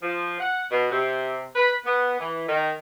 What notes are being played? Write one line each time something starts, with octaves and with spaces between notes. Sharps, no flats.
F3
F#5
B2
C3
B4
B3
E3
D#3